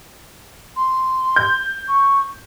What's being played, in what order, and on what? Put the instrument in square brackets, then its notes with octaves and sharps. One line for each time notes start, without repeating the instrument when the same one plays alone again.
[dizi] C6
[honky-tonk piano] G6
[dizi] C#6